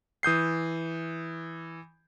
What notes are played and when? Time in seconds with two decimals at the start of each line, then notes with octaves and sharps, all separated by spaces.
0.23 E3 D#6 G6 C7